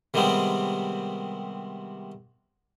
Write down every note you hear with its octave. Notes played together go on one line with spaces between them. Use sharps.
C3 D#3 G3 G#3 B3 C4